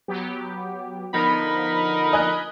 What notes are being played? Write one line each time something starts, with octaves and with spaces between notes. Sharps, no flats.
F#3 B3 G4
D3 F3 B3 D#4 A#4 B5
D#5 G#5 F#6